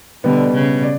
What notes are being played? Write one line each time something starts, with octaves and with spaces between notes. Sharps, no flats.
B2 D3 G3 B3
C#3
D5